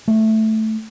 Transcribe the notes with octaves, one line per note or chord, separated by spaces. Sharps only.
A3